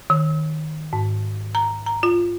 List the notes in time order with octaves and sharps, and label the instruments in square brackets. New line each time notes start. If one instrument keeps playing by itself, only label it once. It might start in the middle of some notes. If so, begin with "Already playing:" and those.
[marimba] D#3
G#2
A#5
A#5
F4